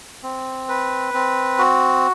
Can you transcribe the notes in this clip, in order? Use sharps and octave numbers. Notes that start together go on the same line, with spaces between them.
C4
B4
C4
F#4